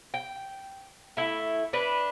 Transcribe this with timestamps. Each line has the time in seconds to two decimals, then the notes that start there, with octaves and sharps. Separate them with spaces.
0.14 G5
1.17 A3 E4
1.73 D4 B4